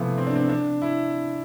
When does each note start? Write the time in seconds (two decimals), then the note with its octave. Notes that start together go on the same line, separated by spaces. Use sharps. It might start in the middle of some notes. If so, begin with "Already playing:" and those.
Already playing: C3 E3 F3 A3 B3
0.18 C4
0.27 D4
0.35 C4
0.49 D4
0.82 E4